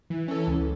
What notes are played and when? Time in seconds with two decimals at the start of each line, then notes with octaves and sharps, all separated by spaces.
0.10 E3
0.28 C#4 A4
0.47 C#2